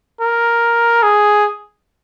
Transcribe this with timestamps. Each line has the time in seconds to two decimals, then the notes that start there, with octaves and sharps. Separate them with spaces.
0.21 A#4
1.03 G#4